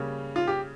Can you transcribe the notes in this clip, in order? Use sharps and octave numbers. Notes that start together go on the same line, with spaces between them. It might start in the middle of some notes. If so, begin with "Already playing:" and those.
Already playing: C#3 G3 A#3 C#4
F4
G4